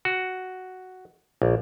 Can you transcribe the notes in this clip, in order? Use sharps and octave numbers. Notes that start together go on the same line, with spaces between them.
F#4
A#1